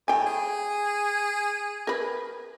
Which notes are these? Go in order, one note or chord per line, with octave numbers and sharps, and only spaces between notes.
A2 G5 G#5
G#4
A#4 B4